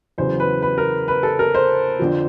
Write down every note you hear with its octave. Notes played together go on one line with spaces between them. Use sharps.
E2 C#3 F#3 C5
B4
B4
A#4
B4
A4
A#4
C5
F2 D3 F3